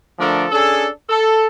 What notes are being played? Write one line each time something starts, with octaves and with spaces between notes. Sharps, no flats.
D3 F3 A3 D4 A4 A#4
C#4 D4 G#4 A4
A4